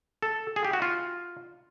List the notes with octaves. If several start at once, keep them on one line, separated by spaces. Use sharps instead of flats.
A4
G#4
G4
F#4
F4